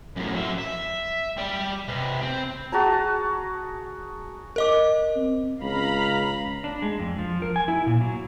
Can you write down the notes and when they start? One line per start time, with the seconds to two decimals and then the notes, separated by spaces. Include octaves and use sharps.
0.16 F#2 A2
0.34 F#3 E5
0.58 E5
1.37 G3 D5
1.88 C3 B4
2.22 C4
2.72 F#4 G#4 A5 A#5
4.56 A#4 D#5 D6
5.16 C4
5.61 C#2 F5 A#5 B5
6.64 D4
6.82 G#3
6.99 F2
7.18 F3
7.42 A#4
7.56 G#5
7.68 E4
7.86 A#2
8.01 F#3